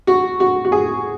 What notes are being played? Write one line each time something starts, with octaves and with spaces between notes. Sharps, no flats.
F#4
F#4
F#4
G#4